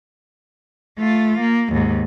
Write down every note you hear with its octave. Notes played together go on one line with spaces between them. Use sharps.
A3 F4
A#3
D#2 G#2